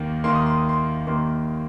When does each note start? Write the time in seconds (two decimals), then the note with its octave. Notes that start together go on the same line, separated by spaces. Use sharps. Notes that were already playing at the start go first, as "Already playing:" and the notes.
Already playing: D#2 D#3 A#3
0.24 D#2 D#3 A#3 C6
0.35 D#6
0.46 C6
0.57 D#6
0.69 C6
1.07 D#2 D#3 A#3 C6